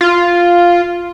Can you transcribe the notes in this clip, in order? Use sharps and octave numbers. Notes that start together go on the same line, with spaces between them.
F4